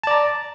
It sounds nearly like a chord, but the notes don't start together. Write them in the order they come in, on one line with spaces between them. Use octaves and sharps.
A5 D5 A#5